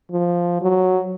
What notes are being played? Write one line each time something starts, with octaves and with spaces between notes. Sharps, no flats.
F3
F#3